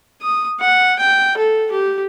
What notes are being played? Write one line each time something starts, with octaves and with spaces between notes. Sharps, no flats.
D#6
F#5
G5
A4
G4